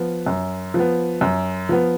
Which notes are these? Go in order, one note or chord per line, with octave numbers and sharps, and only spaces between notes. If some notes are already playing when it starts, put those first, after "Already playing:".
Already playing: F3 B3
F#2
F3 B3
F#2
F3 B3